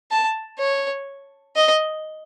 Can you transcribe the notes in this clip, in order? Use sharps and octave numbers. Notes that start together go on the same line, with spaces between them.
A5
C#5
D#5